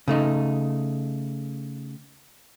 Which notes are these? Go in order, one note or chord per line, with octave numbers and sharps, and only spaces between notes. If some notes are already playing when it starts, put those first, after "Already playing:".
C#3 A3 D#4